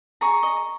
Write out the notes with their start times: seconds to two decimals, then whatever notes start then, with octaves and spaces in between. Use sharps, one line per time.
0.21 G#4 A#5 C#6
0.43 D#5